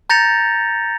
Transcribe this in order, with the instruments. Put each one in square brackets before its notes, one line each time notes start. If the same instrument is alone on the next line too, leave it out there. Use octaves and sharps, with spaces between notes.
[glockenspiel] A#5 G6 A6 A#6 C#7 F7